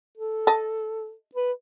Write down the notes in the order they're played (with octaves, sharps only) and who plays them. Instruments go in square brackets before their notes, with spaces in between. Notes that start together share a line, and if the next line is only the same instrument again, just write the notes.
[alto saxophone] A4
[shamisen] D#5 A5
[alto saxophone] B4